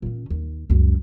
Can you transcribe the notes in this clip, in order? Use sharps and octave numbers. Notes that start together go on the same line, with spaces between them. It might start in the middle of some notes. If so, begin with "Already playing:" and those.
A#2 C#4
D#2
C#2 F#2